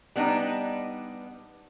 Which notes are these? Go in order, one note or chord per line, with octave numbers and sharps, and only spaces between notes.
G3 B3 D4 D#4